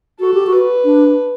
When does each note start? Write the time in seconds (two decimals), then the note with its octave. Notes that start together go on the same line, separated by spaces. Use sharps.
0.20 F#4 A4
0.34 G4
0.47 F#4
0.53 B4
0.85 D4